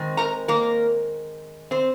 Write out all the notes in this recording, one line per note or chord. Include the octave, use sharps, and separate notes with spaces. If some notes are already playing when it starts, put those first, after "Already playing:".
Already playing: D#3 G#3 C4
A#4 A#5
A#3 A#4
C4 C5